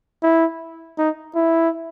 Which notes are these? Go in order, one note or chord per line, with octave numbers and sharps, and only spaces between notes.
E4
D#4
E4